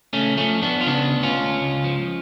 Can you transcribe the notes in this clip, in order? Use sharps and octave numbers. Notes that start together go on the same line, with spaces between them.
C#3 A3 C#4
F3 A3 C#4
F3 B3 D4
F4
C#3 B3 D4
D2
C#4 F4
D2
C#2
F3